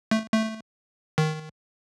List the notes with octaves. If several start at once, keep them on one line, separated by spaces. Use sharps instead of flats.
A3
A3
D#3